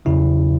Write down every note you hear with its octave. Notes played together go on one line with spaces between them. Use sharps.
E2 C#3 F#3 E4